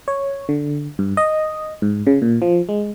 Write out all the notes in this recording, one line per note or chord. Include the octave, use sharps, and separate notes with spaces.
C#5
D3
G2
D#5
G#2
C#3
A#2
F3
G#3